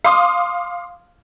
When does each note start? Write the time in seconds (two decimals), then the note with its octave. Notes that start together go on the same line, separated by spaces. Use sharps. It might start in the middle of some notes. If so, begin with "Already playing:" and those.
0.04 F5 C6 D6 D#6